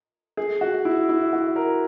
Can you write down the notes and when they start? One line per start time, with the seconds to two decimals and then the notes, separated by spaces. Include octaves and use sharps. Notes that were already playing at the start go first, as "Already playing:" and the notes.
0.37 G#4
0.61 F#4
0.85 E4
1.09 E4
1.33 F#4
1.56 A#4